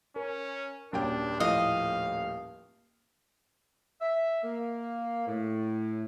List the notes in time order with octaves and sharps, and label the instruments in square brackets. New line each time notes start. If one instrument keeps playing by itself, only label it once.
[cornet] C#4 [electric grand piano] A#4
[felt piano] D#1 C#4 G5 [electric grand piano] F#2 [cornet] D4
[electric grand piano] A2 F3 A3 [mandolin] D#5 [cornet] F5
[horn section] E5
A#3
A2